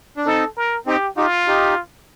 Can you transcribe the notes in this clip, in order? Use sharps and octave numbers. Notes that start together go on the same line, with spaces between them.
D4
C4 D#4 A4
A#4
C4 D#4 G4
D#4 F4 G4
D#4 G4